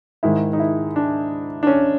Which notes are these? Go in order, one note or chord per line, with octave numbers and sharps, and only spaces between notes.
G#2 D#3 G#3 E4
D#4
E4
D4
D4
C#4